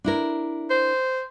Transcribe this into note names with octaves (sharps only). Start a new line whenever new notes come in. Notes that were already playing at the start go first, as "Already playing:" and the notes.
D4 E4 A#4
C5